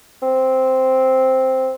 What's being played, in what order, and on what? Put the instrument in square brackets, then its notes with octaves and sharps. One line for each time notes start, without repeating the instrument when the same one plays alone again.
[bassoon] C4